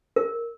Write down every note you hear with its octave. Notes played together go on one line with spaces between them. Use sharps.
A#4